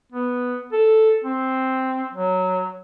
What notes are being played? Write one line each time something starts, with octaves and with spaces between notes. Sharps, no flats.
B3
A4
C4
F#3